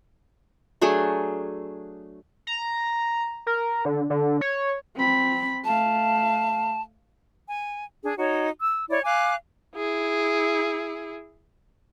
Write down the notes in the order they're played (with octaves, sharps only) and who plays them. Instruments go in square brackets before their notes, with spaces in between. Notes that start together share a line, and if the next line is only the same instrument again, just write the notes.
[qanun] F#3 A3 D4 G#4
[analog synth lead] A#5
A#4
D3
D3
C#5
[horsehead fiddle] C4 B5
[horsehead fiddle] A3 F5 [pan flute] A5
[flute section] G#5
D4 G#4
D#4 F#4 C#5
E6
E4 C#5 D5
F5 G#5 D6 F#6
[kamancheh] E4 G#4